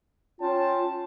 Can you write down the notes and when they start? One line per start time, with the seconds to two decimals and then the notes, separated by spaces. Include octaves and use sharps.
0.40 C#4 F4 G5 A5